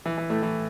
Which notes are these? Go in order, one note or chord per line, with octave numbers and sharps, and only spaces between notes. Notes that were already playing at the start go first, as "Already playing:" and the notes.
E3
E3
A2 A3
E3